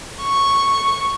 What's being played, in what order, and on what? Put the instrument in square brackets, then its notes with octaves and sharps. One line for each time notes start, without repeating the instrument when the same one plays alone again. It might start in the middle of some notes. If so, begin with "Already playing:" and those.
[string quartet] C#6